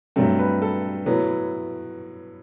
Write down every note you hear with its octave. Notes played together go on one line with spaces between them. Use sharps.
G2 F#3 A3 C4
B4
A4
A2 F#3 A3 B3